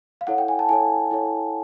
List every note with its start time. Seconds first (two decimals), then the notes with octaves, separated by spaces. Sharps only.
0.21 F5
0.27 E4 A4 C#5 F#5
0.38 G5
0.48 G#5
0.59 A5
0.69 E4 A4 C#5 G#5
1.11 E4 A4 C#5